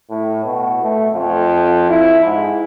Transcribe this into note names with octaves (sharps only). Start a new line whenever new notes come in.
A2
B2
A3
F2
E4
G#2